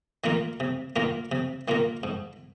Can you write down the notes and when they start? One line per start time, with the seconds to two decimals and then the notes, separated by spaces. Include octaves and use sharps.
0.24 D#3 A#3 F4 A#4
0.60 C3
0.96 D#3 A#3 F4 A#4
1.32 C3
1.68 D#3 A#3 F4 A#4
2.03 G#2